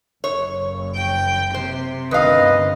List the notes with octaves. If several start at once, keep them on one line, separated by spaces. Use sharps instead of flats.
F#1 C#5
G5
C3 C5
G1 D2 D#3 B4 D#5 F5